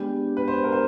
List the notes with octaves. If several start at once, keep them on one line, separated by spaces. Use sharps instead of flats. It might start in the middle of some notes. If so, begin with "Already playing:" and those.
Already playing: G#3 B3 D4 G4
B4
C5
A#4
C5